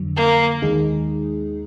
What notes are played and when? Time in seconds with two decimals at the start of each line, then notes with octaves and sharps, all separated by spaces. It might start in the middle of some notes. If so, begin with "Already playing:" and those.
Already playing: F2 D3 F#3
0.17 A#3
0.62 D#2 D#3 G#3 D#4 G#4